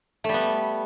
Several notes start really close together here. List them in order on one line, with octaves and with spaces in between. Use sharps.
A3 G3 B3